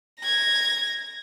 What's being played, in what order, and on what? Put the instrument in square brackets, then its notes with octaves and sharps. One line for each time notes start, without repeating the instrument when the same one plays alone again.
[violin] G#6 A#6